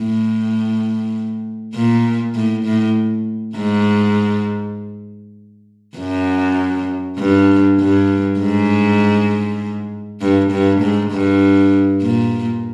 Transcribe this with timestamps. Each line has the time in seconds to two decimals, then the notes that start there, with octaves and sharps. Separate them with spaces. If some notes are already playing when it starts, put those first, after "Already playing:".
Already playing: A2
1.74 A#2
2.35 A2
2.64 A2
3.56 G#2
5.97 F#2
7.18 G2
7.79 G2
8.39 G#2
10.21 G2
10.51 G2
10.81 G#2
11.11 G2
12.02 A#2